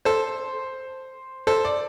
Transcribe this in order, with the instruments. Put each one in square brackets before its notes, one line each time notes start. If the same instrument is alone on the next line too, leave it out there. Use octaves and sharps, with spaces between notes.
[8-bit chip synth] A4 [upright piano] C5
[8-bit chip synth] A4 [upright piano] C5
[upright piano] D5